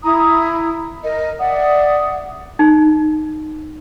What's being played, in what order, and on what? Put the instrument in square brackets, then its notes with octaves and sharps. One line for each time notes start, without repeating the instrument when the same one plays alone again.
[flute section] E4 A#5 D#6
A#4 D#5
D5 E5 F#5 D#6
[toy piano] D#4